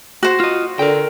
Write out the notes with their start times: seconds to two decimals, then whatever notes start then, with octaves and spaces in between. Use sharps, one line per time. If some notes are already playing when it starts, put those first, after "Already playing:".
0.23 F#4 C5
0.40 F4 D#5
0.79 D3 A#4 G5